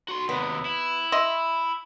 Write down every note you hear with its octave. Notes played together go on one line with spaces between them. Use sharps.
F#4 C6
D#2 C3 B3
E4
D#5 E5 C6